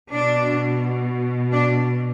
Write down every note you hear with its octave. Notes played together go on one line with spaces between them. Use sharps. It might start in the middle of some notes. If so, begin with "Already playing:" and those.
B2 D4
D4